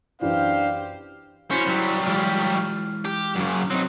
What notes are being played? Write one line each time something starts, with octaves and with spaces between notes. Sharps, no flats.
F#2 E3 D4 E4 G4 C5 F5
C#4 E4 F#4 C5
F#3 G3
E3 G#3 F4
G4
F#2 C#3
F#3 C4 D#4